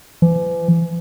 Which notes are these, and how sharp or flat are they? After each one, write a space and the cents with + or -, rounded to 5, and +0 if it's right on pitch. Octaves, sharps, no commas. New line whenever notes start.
E3 +40